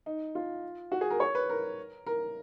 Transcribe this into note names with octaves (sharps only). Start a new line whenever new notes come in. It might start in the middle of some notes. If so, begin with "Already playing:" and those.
D#4
F4
F#4
G#4
A#4
C#5
B4
A#4
A#4